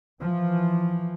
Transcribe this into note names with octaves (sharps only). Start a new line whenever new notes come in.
E3 F3